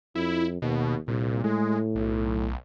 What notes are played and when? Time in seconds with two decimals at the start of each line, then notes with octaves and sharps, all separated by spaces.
0.15 F2 E4
0.62 D#2 B2
1.08 C2 A#2
1.44 A2 G#3
1.95 B1